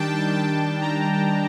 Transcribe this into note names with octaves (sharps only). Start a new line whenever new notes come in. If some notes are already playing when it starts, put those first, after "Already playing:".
Already playing: D#3 G3 D4 G5 A5
A5
A#5